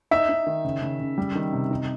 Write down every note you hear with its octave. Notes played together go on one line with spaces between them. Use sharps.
D#4 E5
D#4
D#3
C#3
C#3
C#3
G3
D#3
C3
D#4